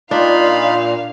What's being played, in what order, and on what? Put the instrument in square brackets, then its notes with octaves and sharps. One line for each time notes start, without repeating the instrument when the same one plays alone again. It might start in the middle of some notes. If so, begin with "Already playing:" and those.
[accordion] A#2 [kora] D4 [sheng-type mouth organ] D#4 F4 B5 [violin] F5